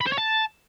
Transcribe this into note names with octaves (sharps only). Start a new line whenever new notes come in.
B5
C5
C#5
A5